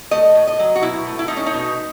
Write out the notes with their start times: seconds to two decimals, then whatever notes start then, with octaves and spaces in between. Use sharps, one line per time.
0.11 A3 D#5
0.35 A2
0.47 D#5
0.59 F#3
0.76 F#4
0.82 B2 E4
1.07 A3
1.19 E4
1.28 A3 D#4
1.37 C#4
1.46 D#4
1.54 B2